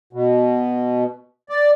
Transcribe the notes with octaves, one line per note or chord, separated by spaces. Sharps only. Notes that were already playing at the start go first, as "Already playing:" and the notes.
B2
D5